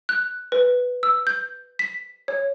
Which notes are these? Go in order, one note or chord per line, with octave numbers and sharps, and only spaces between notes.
F#6
B4
E6
G6
B6
C#5